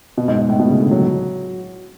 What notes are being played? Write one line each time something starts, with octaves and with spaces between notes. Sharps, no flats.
B2
G#2
G#2
A2
B2
C#3
D3
F#3